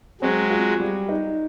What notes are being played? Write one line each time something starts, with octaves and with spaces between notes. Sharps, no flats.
F#3 G#3 C4
F4
G3
D#4